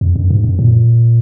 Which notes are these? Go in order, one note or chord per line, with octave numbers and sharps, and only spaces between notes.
F2
F#2
G#2
F#2
A#2